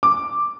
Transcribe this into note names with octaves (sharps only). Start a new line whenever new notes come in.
D6